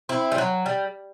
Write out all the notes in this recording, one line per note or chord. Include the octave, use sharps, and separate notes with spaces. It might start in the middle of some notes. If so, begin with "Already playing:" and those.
C4 E4
G3
F#3
G3